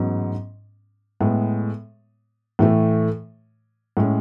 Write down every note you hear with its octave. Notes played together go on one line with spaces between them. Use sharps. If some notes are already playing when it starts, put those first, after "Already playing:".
Already playing: A1 G#2 F#3 B3
A2 G#3 B3
A2 E3 A3
A2 G#3 C#4